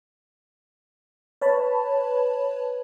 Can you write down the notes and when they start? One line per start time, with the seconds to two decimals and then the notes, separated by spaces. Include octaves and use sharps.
1.41 B4 C#5 A5 B5